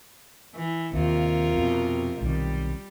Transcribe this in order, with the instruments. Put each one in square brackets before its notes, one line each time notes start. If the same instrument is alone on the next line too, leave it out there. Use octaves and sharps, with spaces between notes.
[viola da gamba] E3
[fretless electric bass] D#2 [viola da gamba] C3 F4 A#4
[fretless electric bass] F2 B2
[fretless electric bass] B1 C3 D#3 [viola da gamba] G3